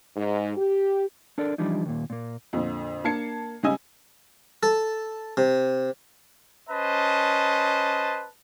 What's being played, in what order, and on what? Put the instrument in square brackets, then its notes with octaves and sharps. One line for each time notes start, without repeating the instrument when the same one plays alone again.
[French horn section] G#2
G4
[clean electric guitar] D4 A4 A#4 D5
E3 F3 G3 D4 D#4
D#2 A#2
A#2 A#3
[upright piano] F2 A#2 D3
A#3 D4 A5 G#6 C7 C#7
C#2 G3 C#4 D#5 G#5 E6
[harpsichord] A4
C3
[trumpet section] C#4 B4 C5 D#5 A5